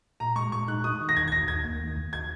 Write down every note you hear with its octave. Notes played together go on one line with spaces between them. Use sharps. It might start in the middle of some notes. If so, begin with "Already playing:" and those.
A#2 A#5
G#3 C#6
A#2 C#6
D#4 F#6
D#4 D#6
D#3
A#6
D#2 G#6
G#6
D#2 A#6
D#2 G#6
A#3
D#3
D#2
G#6